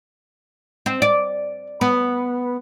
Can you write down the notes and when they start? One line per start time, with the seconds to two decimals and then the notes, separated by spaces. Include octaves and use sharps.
0.86 C4
1.02 D5
1.81 B3